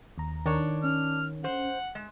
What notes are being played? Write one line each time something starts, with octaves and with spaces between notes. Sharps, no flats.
D#2 A#5
D#3 D4 C#5
C#4 F6
C5 F#5
G#3